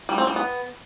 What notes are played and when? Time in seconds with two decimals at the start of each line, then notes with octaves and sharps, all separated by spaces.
0.09 G3
0.18 C4
0.27 G3
0.36 B3